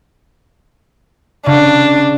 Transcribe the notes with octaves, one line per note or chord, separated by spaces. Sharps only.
C#3 D4